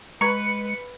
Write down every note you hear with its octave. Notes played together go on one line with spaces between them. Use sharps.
G#3 B4 A#5 C#6 G#6 C#7